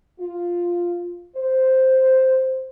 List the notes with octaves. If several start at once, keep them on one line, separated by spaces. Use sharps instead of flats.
F4
C5